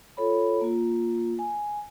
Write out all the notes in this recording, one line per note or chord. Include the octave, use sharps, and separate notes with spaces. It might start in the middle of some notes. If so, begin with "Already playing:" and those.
F4 A4 C#5 B5
A#3 F4
G#5